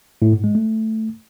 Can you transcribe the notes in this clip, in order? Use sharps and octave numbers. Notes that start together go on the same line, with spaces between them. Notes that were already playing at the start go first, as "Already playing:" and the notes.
A2
G#2
G#3
A3